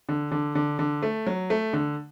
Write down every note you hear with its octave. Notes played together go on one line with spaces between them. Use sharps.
D3
D3
D3
D3
A3
F#3
A3
D3